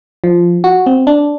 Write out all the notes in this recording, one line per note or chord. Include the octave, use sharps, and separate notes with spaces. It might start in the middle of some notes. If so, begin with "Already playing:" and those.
F3
F#4
C4
D4